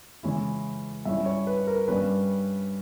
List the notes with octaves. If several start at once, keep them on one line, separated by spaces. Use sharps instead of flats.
C#3 E3 G#3 C#4 E4
G2 G3 C#4 E4 E5
C#5
B4
A#4
G2 G3 C#4 B4